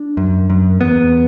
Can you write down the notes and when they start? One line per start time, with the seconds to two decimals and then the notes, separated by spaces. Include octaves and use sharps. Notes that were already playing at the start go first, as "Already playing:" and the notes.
Already playing: D4
0.17 F#2
0.50 F#2
0.80 E2 B3